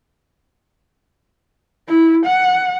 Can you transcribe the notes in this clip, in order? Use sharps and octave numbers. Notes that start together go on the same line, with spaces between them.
E4
F#5